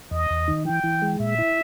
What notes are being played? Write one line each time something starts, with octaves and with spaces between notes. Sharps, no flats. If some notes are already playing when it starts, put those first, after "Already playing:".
E2 D#5
E2
D#3
E3 G5
E3
G#3
A#2 E5
E4